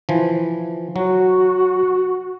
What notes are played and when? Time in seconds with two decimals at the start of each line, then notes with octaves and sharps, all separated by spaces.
0.09 E3 F3
0.96 F#3 F#4